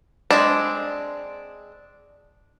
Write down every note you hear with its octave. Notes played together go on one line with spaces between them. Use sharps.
G#3 C4 D4